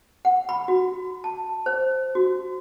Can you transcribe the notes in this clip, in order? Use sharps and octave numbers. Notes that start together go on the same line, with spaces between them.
F#5
B5
F#4
A5
C5
F#4